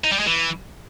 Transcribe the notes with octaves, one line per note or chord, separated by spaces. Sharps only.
D#4
G3
G#3
E3